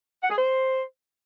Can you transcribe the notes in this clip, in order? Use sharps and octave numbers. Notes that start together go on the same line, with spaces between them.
F#5
G#4
C5